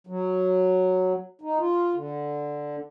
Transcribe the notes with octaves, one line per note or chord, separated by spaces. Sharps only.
F#3
D#4
F4
D3